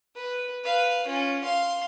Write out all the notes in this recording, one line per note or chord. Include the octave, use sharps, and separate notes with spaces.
B4
B4 F5
C#4 F4
F5 C6